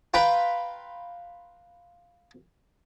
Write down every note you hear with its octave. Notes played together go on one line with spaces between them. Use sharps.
F4 B4 G5 A#5 B5